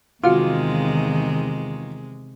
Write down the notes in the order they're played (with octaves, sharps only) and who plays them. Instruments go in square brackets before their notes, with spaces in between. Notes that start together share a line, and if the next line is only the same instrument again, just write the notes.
[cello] E2 D#3 [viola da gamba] C3 G#3 [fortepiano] F4 [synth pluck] F#4 F5 D6